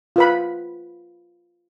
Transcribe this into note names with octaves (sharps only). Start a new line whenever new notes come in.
F4 B4 B5